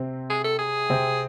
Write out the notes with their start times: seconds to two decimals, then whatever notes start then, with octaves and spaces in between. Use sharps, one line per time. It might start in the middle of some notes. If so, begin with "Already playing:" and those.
Already playing: C3 C4
0.30 G#4
0.44 A4
0.59 G#4
0.90 C3 C4